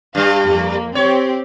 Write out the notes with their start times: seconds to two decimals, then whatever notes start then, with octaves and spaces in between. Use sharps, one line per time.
0.15 G2 G3 F5
0.45 F2 A#3
0.95 C4 G4 C#5